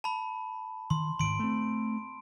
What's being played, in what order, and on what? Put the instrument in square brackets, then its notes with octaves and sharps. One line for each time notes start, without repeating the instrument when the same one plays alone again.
[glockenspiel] A5 B5
[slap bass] D#3 [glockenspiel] C6
[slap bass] D2 G#2 D#3 [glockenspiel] C6 D7
[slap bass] A3 C4